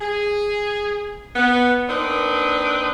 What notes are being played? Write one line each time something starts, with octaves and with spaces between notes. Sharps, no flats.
G#4
B3
A#3 C4 D4 D#4 B4